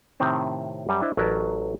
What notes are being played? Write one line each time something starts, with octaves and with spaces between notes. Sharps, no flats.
A2 C3 D#3 C4 A5
F#2 G3
D4 E4 C5 D#5
A1 F#3 A#4 B4 D5 A5